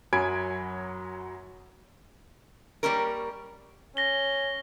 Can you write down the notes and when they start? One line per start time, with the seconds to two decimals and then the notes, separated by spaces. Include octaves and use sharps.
0.13 F#2 F#3 G#5 B5 G#6 D7
2.83 G3 A#3 C#4 A#4
3.97 C#4 A#6 G7